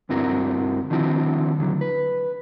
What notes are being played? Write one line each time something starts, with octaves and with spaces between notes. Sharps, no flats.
D2 G2 C4 E4 F#4 A#4
D3 D#3 F3 C4 E4 F#4
D#2 D3 F#3
B4